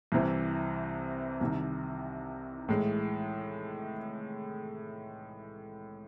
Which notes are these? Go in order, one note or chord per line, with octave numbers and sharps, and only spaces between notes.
C2 C3 E3 C4
C2 C3 D#3
A2 E3 G#3